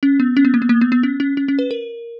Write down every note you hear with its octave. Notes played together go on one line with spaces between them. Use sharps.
C#4
B3
C#4
B3
A#3
B3
A#3
B3
B3
C#4
C#4
C#4
C#4
B4
A#4